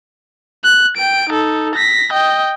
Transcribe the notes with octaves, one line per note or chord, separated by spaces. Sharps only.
F#6
G5 D7
D#4 A4
A#6 B6
D#5 G5